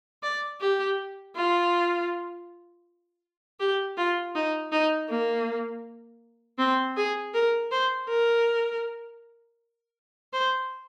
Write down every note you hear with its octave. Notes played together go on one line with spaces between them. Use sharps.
D5
G4
F4
G4
F4
D#4
D#4
A#3
C4
G#4
A#4
C5
A#4
C5